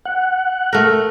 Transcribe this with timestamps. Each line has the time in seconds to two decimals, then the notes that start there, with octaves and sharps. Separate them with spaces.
0.06 F#5
0.73 A3 A#4